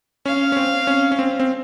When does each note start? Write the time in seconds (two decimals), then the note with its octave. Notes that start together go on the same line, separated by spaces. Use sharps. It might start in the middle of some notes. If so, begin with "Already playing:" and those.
0.26 C#4 F5
0.52 C#4
0.57 C4
0.87 C#4
1.12 C#4
1.19 C4
1.40 C4